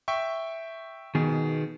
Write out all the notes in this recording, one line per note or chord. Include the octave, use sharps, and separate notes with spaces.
E5 G5 C#6
B2 D#3 B3 G#4